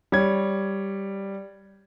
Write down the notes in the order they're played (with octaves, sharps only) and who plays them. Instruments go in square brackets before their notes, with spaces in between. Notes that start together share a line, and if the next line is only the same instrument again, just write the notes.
[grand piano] G3 C#5 G#6